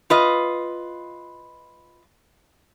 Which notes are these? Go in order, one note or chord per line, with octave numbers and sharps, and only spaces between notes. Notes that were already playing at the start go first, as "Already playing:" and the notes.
F4 B4 D#5